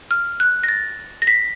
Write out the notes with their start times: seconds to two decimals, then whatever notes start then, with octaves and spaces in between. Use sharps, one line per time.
0.11 F6
0.40 F#6
0.64 A#6
0.68 A6
1.22 A#6
1.27 B6